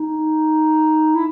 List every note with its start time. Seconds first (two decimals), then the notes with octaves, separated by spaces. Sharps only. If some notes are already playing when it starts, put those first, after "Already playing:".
Already playing: D#4
1.15 E4